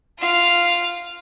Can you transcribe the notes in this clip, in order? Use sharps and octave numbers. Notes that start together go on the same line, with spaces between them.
F4 F5